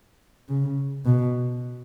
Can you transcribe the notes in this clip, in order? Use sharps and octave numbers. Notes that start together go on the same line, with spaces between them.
C#3
B2